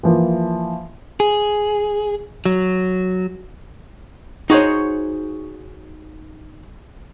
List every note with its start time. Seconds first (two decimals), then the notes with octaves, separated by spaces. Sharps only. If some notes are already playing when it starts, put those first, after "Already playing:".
0.03 E3 F3 A#3
1.20 G#4
2.45 F#3
4.50 D#4 F#4 G#4 C5 C#5